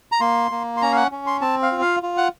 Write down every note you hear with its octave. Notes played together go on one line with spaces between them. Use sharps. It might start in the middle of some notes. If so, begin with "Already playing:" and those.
A#5
A#3 C6
A#3
C6
C#4 A#5
F5
F#5
C#4
C6
C4 A5
F5
F4
F5
F4
F#5